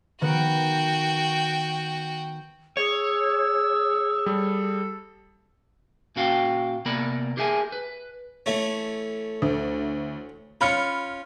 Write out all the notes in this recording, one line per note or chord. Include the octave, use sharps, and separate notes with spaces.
D#3 B3 F#4 G5
G#4 C#5 E6
G3 A4
A#2 C#4 F#4 F5 G5
C3 A#3 B3 A#4 D5 B5
G4 G#4 A#4 E5 F#5 G#5
B4
E3 A3 C#4
D2
C#4 F4 B5 F6 C#7